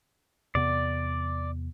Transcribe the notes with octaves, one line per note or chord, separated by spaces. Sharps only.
E2 C3 B3 D5